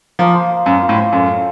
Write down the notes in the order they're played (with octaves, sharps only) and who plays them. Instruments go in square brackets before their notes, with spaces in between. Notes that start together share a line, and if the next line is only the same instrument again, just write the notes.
[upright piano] F3 [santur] A#3
[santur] C5
A#3
[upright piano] F#2 [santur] A#3
[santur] F4
[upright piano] A2
[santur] C5
[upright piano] F#2 [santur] A4
[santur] C#5